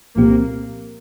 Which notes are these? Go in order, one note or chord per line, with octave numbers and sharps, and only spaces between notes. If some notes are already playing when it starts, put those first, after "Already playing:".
C2 A#2 F3 A#3 C4 G4